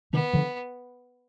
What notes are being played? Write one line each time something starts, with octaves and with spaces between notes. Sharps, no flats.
C3 D#3 B3
D3 F3